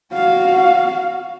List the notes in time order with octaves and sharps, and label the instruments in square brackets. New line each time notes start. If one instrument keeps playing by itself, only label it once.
[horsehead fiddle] F#4 F5